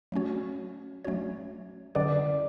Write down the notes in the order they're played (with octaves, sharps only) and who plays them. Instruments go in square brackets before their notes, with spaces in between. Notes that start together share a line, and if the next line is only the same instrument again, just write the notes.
[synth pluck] F#3 A3 C#4 F#4 C#5
F#3 A3 C#4 F#4 C#5
[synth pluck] D3 F#3 C#4 G#4 B4 [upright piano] D5